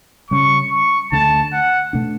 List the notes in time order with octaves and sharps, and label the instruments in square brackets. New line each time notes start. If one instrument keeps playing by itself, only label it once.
[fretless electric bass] C#3 G3 C#4 [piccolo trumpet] C#6
[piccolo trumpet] C#6
[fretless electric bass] D2 D3 A3 D4 [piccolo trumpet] A5
[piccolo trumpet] F#5
[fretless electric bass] B2 A3 D4